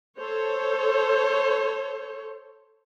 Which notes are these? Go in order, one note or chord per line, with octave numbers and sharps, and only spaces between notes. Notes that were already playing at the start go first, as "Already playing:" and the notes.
A4 C5 C#5